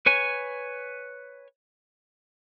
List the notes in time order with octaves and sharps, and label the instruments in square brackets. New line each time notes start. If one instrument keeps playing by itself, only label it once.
[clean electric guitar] B4 C#5 G#5